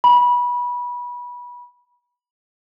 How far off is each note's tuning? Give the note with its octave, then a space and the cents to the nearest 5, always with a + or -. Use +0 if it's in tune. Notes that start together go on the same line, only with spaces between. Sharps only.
B5 -20